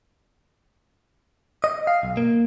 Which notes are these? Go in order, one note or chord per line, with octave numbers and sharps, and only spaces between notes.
D#5
F5
B1
A#3